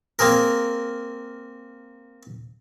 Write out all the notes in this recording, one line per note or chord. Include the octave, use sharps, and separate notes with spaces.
A#3 C4 G#4 A#4